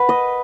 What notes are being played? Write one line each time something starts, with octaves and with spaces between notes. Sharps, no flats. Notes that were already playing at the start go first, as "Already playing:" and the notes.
Already playing: B4 F#5
D#5